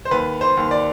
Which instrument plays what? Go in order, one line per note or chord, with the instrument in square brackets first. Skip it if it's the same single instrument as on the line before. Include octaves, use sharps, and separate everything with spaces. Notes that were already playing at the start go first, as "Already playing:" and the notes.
[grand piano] C5
D#2 B4
C5
D#2
D5